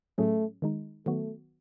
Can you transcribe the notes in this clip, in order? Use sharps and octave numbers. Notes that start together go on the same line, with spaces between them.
A2 F#3 A3 C#4 G#4
D#3 G#3 D#4
D#3 F#3 A3 B3 F#4